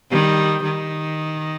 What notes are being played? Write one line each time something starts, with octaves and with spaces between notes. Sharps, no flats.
D#3 G3
D#3